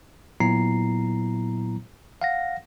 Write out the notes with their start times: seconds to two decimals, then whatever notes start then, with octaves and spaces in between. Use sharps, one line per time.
0.40 A#2 F#3 B3 E4 A#5 C7
2.22 F5 F#5 A#6